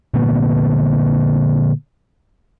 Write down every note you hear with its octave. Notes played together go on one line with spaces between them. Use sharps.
A#2 D3 A#3 B3